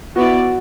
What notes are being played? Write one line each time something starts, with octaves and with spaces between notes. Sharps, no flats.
B3 E4 F#4 B4 D5